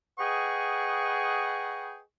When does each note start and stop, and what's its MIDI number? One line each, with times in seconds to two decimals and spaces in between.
0.19 1.99 68
0.19 1.99 71
0.19 1.99 75
0.19 1.99 78
0.19 1.99 79
0.19 1.99 85